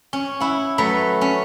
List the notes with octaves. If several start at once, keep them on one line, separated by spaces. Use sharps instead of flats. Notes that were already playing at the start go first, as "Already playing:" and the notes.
C#4
E4 F#5
F#3 A3 B4
C#4